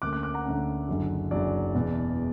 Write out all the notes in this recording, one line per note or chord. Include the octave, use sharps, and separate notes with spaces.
D2 D3 A#3 C#4 D6 F#6
D6 F#6
D6 F#6
F#5 A#5
D2 D3 A#3 C#4
F#1 F#2 D3 F#3
F#1 F#2 D3 F#3 D5
E1 E2 B2